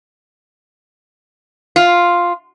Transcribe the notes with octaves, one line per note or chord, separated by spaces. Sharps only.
F4